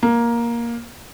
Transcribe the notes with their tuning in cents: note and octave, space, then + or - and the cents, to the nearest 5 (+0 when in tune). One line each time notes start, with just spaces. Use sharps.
A#3 +10